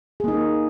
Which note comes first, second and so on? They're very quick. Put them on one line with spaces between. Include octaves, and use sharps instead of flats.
G#4 A#3 D#4